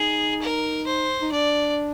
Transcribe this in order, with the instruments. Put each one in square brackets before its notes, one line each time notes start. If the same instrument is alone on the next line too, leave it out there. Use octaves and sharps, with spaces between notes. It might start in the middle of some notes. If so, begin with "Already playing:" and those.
Already playing: [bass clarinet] D#4 [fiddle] G#4
[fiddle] A#4
C5
[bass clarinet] D#4
[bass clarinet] D4 [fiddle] D5